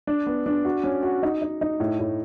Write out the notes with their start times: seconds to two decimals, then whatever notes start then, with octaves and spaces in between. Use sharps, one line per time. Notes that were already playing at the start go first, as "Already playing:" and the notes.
0.07 D4
0.27 B3
0.46 D4
0.65 F#4
0.84 C#4
1.03 F#4
1.23 D#4
1.42 D#4
1.61 D#4
1.80 A2
2.00 A2